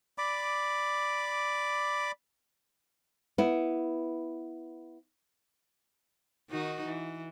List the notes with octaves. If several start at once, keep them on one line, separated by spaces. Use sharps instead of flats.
D5 B5 D6
B3 E4
D#3 D#4 F#4
E3